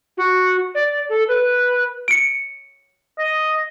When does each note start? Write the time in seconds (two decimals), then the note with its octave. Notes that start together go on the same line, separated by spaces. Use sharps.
0.17 F#4
0.75 D5
1.09 A4
1.28 B4
2.08 C#7 D7
3.19 D#5